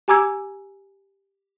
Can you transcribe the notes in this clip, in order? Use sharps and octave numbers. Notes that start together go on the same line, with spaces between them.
G4 G#5 A#5 D6 E6 G#6